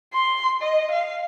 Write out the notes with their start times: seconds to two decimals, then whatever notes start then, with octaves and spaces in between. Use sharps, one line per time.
0.13 C6
0.62 D#5
0.91 F5